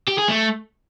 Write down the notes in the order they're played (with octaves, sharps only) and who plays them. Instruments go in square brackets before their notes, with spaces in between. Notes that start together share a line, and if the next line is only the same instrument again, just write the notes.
[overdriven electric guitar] G4
G#4
A3